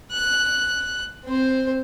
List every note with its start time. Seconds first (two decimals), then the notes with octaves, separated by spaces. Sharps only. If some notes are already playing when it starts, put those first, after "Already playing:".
0.12 F#6
1.25 C4 C5